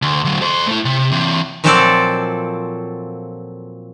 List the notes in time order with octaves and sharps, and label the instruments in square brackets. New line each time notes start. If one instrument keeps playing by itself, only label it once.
[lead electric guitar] D2
D2 F#3
A4 C5
A3 E4
C3
E3 C4
[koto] A#2 F3 F#3 C4 A4 D5